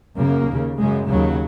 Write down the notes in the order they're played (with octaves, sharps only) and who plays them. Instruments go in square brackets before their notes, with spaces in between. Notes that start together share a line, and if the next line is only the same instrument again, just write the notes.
[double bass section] F#2 C#3 A#3
D#2 C#3
F#2 C#3 G#3
D#2 C#3 F#3